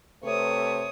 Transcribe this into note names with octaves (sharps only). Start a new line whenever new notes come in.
C3 A3 B4 C#5 D#6